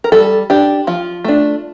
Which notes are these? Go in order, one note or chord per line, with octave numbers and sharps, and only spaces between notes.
A#4
G3 A4
D4 G4
F3 F4
A3 D4